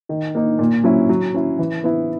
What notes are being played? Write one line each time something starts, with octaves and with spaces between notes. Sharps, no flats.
D#3
A#3 D#4
A#2
F#3 C#4 E4
F#3
C#4 E4
E3
B3 E4